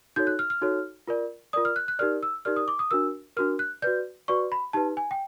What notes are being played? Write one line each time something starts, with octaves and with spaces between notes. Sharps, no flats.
D#4 F#4 A4 C#5 G6
F#6
F6
F6
D#4 F#4 A4 C#5
F4 A#4 D5
F4 A#4 D5 D#6
F6
F#6
F#6
D#4 G4 A#4 D5 F6
E6
D#4 G4 A#4 D5 F6
D#6
D6
D#6
D4 F#4 A#4 E6
D4 F#4 A#4 F6
F#6
F#4 B4 D5 G6
F#4 B4 D5 C#6
B5
D#4 G4 B4 A5
G#5
G5